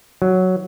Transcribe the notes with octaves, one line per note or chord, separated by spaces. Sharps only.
F#3